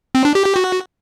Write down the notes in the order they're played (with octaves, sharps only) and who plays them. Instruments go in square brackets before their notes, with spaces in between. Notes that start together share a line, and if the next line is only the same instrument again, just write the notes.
[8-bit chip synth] C4
D4
G4
G4
F#4